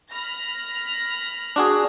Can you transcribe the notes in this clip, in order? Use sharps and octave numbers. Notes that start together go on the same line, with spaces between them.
B5 F6 A#6
D4 F#4 G#4